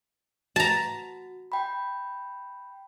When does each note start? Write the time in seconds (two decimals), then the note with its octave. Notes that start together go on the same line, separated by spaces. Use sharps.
0.56 F#4 A5 A#5
1.52 G5 B5